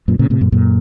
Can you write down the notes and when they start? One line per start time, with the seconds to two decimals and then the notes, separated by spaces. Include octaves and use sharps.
0.08 F#2 A#2
0.19 A#2 C#3
0.30 A2 C3
0.41 F#2 A#2
0.52 F#2 A#2